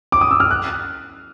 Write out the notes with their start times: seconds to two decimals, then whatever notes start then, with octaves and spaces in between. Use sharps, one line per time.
0.12 D6
0.21 D#6
0.31 E6
0.40 F6
0.51 F#6